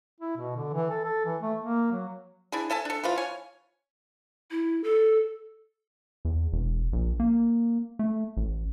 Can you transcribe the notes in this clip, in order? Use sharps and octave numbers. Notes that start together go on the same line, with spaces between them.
E4
B2
D3
E3
A4
A4
E3
A3
A#3
F#3
D4 E4 G#4
A4 E5 G#5 A5
D4 A4
E3 F3 F4
C#5 G#5
E4
A4
E2
E1
A#1
A#3
A3
A1